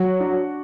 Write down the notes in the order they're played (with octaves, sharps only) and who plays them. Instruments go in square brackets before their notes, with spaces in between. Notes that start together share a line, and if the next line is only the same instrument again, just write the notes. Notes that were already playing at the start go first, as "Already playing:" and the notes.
Already playing: [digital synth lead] F#3 [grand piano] F#4
[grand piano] D4